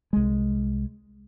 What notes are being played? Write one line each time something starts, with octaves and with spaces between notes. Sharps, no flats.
C2 G#3